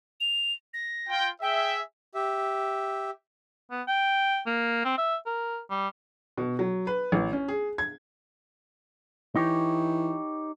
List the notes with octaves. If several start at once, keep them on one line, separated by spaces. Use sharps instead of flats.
F7
A#6
F4 G5
G#4 E5 G5
G4 E5
B3
G5
A#3
C4
E5
A#4
G3
B2
F#3
B4
A1
C#4
G#4
G#6
E3 D#4 G4 C#5